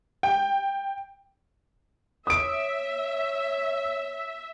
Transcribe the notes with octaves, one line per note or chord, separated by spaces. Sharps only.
G5
C#5 E5 D#6 D7